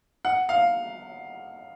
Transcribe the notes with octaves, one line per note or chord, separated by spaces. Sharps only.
F#5
F5